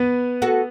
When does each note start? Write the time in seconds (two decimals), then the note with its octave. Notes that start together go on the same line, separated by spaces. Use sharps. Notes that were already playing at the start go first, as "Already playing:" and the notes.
Already playing: B3 B4
0.42 F#4 A4